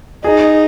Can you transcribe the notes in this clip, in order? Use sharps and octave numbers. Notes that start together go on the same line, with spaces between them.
D#4 G#4